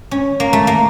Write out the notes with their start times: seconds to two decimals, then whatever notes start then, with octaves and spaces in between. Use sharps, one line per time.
0.11 C#4
0.40 A#3
0.53 A3
0.67 A#3